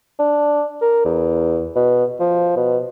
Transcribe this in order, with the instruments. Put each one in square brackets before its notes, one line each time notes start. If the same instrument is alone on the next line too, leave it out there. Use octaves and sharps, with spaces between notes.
[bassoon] D4
A#4
E2
B2
F3
B2